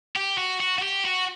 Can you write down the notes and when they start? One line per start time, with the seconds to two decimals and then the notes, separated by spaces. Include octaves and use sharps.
0.16 G4
0.38 F#4
0.60 F#4
0.78 F#4
0.82 G4
1.05 F#4